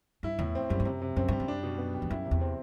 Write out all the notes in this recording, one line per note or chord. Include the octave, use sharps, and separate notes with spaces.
G2 E4
E2 A2
C4
F#2 G3
G2
F#2 C3
C3
F#2 C4
G2 G3
F#2
D4
B2
B3
G3
E2
F#2 E4
C3
E2
C4